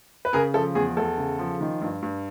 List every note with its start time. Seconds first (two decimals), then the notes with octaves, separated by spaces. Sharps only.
0.25 B4
0.33 C#3 G#4 A#4
0.54 F3 A4
0.75 E2 G#4
0.97 E2 A4
1.18 C#3
1.39 F3
1.61 D#3
1.81 G2
2.02 G2